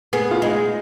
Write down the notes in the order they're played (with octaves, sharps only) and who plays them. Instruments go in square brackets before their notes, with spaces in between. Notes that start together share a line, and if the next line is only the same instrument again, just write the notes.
[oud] B3 [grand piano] G#4
[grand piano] F4
[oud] G#3 [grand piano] D#4